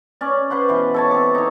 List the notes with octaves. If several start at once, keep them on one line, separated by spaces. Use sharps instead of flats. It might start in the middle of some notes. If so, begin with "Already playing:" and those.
C#4 D5
B4 C5 F#5 C6
B2 E3
A4 C#5 A5
C4 D6
D#4 C#5